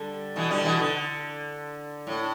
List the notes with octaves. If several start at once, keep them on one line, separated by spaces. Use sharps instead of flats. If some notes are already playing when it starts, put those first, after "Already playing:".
Already playing: D3 G3
B2 E3
D3 G3
B2 E3
D3
A2